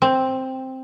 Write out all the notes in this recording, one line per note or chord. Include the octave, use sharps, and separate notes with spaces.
C4